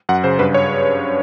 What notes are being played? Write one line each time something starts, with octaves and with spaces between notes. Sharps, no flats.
F#2 F#5
C#3 C5
G2 B4
C#5